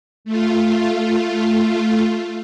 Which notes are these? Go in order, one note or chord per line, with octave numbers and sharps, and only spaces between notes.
A3 F4